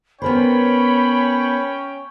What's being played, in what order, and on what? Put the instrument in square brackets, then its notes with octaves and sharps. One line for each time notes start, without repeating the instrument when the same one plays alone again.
[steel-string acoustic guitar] B3 A#4 C5 [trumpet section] C#4 C#5 G5 [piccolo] B5